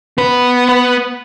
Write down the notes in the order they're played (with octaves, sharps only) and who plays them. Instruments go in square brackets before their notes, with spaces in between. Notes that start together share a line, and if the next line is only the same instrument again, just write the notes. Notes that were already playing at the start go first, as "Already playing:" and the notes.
[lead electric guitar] B3 B4